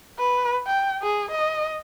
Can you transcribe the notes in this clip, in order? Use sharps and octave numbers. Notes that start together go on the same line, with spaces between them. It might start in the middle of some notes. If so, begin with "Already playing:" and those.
B4
G5
G#4
D#5